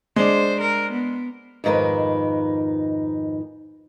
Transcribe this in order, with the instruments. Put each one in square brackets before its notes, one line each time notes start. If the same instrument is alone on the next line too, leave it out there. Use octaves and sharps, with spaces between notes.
[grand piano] G#3 D4 [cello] C5
[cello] A#4
B3
[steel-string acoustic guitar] F2 G#2 D#3 A#4 B4